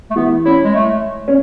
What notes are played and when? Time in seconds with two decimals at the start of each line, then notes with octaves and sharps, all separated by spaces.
0.10 A3
0.16 E3 B3
0.45 C#4 E4
0.64 G#3
0.75 A3
1.28 C#4